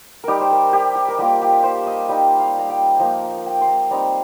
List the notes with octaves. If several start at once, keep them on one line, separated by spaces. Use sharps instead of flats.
G3 D#4 G4 A#4
C5
A#4
G4
G4
A#4
G3 A#3 F4 G4
G4
C5
D#5
G3 D#4 G5
F5
A#5
G5
F3 A#3 D#4 A#5
A#5
A#5
G5
C6
A#5
G3 C4 D#4 A#5